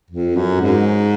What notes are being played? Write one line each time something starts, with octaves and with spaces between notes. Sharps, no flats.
F2
F#2
G#2